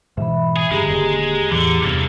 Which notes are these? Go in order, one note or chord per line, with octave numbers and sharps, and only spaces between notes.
G#2 B2 E3 E5 B5
G#4
G2 C#3 G#3 G4 G#4 A#5
D#1 D#2 D3
E2 A2 D3 E3
E2 G2 C3 A#3 A4